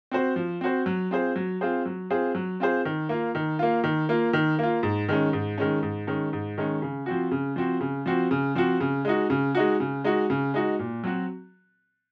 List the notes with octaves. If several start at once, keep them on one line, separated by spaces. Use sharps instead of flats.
C4 F#4 C5
F3
C4 F#4 C5
F#3
C4 F4 G#4 C5
F#3
C4 F4 G#4 C5
F#3
C4 F4 G#4 C5
F#3
C4 F4 G#4 C5
D#3
A#3 F4
D#3
A#3 F4
D#3
A#3 F4
D#3
A#3 F4
G#2
D#3 G#3 C#4
G#2
D#3 G#3 C#4
G#2
D#3 G#3 C#4
G#2
D#3 G#3 C#4
C#3
F3 C4 F#4
C#3
F3 C4 F#4
C#3
F3 C4 F#4
C#3
F3 C4 F#4
C#3
G#3 D#4 F#4
C#3
G#3 D#4 F#4
C#3
G#3 D#4 F#4
C#3
G#3 D#4 F#4
A#2
F#3 C4 F#4